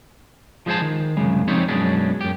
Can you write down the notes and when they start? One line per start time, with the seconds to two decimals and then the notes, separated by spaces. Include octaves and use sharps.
0.66 F3 G#3 D#4 G#4 C5 A5
0.82 D#3
1.17 C2 F#2 C#3 G#3
1.48 F3 G3 C4 D#4 C#5
1.68 F#2 B2 G#3 C#4 D4
2.21 F#2 G4